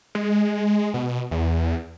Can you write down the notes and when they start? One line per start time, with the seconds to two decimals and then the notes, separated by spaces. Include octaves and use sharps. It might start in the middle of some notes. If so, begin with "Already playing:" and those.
0.15 G#3
0.94 B2
1.31 E2